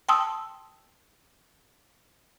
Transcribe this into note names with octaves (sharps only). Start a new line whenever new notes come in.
G5 A5 C6 D#6 E6